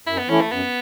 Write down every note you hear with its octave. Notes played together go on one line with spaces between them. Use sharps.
F#2 E4
B3
E3 A3 C#4 E4
A3
F#2 B3